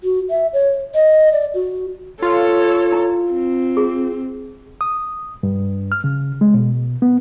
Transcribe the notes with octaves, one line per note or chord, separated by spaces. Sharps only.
F#4
E5
C#5
D#5
D5
F#4
F4 A4 C#5
E4
C4
G#4
D#6
G2
F6
C#3
G#3
B2
B3